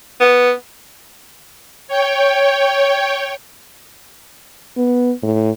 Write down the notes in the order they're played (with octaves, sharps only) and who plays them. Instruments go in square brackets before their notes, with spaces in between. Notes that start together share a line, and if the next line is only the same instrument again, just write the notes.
[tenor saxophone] B3
[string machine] C#5 G5
[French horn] B3
A2